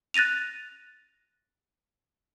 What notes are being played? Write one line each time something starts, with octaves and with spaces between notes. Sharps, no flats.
F#6 A6 A#6 D#7 F7